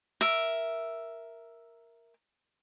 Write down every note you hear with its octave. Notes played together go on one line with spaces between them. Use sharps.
A#4 E5